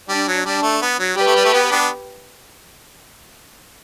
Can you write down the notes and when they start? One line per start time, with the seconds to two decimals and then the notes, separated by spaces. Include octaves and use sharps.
0.09 G3 D4
0.28 F#3
0.46 G3 D4
0.63 A3
0.82 B3
0.99 F#3
1.17 G3 G4 B4
1.27 A3
1.36 G3
1.45 A3
1.53 B3
1.71 B3 D4